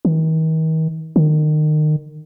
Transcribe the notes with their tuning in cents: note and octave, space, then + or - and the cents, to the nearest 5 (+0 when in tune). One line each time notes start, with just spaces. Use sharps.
D#3 +40
D#3 -30